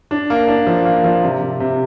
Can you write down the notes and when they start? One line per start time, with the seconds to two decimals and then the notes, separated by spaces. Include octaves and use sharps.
0.11 D4
0.30 A#3
0.48 D4
0.67 F3
0.85 A#3
1.04 F3
1.23 C3
1.42 C3
1.60 C3